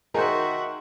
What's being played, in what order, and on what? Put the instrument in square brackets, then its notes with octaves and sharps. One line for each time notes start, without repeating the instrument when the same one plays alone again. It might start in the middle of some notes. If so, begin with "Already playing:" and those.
[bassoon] D#3 [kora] D#4 C5 [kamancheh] F#4 E5 [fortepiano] G#4 A#4 G#5